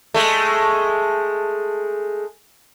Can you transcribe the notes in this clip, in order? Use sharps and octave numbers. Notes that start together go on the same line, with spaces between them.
G#3 A3